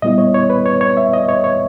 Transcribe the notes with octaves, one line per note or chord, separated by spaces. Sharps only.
A#2 G3 B3 E4 D#5
C#5
C#5
B4
C#5
C#5
E5
D#5
C#5
C#5